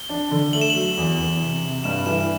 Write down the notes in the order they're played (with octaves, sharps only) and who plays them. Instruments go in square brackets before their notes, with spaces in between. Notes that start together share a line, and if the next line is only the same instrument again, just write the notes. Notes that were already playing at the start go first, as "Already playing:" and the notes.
Already playing: [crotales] G7
[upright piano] D4
D3
[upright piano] A3 [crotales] F#7
[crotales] E7
[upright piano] F#3 [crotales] F#7
[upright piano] E2
E2
C3
C3
[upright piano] G2 [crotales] E7
[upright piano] E3 [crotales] E7